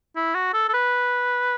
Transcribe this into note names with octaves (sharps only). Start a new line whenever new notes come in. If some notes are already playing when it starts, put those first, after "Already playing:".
E4
F#4
A4
A4
B4